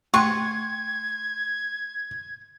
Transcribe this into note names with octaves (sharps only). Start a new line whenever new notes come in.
A3 G5 C6 C#6 G#6